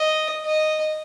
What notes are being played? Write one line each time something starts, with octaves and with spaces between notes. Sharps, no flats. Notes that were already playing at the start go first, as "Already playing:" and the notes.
Already playing: D#5
D#5